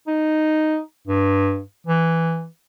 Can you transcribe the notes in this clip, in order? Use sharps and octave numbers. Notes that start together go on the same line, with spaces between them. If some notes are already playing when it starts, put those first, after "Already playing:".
D#4
G2
E3